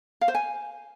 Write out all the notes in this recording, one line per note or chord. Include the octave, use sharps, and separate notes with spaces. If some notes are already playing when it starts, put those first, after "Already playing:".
F5
C5
G#5